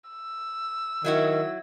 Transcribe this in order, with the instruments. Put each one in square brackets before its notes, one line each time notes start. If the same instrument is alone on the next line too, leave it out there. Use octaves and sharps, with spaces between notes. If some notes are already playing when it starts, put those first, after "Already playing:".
[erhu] E6
[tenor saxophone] D#3 [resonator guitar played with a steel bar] F#3 E4 F#4